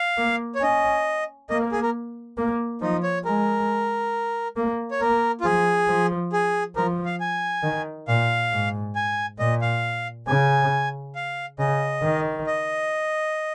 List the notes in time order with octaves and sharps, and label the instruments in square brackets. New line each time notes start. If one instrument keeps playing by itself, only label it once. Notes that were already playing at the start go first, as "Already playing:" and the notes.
Already playing: [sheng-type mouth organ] F5
[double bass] A#3
[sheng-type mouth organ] C#5
[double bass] C#4 [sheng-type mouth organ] D#5
[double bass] A#3 [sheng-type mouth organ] D#5
[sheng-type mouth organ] G#4
A#4
[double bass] A#3
[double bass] F3 [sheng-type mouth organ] D#4
[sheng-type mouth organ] C#5
[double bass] G#3 [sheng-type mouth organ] A#4
[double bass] A#3
[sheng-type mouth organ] C#5
[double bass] A#3 [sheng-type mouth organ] A#4
[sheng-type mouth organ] F4
[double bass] F3 [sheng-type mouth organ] G#4
[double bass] F3
[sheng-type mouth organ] G#4
[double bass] F3 [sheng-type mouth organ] A#4
[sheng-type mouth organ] F5
G#5
[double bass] D#3
[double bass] A#2 [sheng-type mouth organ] F5
[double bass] G#2
[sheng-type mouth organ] G#5
[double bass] A#2 [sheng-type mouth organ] D#5
[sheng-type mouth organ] F5
[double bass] C#3 [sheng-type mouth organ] G#5
[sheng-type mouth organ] F5
[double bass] C#3 [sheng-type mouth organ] D#5
[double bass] D#3
[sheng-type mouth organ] D#5